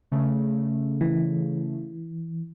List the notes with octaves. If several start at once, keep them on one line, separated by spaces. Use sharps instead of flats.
C#3 A3
E3